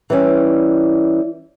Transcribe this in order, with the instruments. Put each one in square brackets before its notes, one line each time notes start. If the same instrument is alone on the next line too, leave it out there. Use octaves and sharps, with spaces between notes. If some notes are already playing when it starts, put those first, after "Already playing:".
[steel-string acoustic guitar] E3 G3 C#4